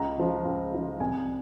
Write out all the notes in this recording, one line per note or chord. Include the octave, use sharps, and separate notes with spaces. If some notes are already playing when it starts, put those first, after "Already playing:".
Already playing: C#2 A#5
C#3 F3
C#2
C#3 F3
C2 G#5